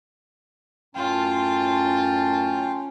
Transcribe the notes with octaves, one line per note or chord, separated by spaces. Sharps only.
F#2 A2 C#4 F4 G5 A5